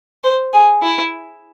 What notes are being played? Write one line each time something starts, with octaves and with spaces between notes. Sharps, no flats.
C5
G#4
E4